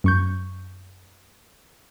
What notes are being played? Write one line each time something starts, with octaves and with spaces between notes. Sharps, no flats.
F#2 C#6 G6